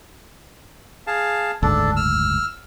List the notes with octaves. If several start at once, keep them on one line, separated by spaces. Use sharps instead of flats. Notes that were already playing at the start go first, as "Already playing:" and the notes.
G#4 F5 A5
F#1 D2 G#2 D4 A4
E6 F6